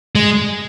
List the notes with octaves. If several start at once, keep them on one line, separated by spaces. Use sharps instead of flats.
G#3